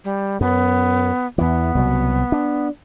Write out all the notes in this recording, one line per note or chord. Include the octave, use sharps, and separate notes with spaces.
G3
F#2 B3
E2 E3 B3
C2 B2 F#3
D4